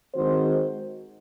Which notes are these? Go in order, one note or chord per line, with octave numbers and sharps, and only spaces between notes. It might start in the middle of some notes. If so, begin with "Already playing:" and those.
D#3 G#3 C4 F#4 C5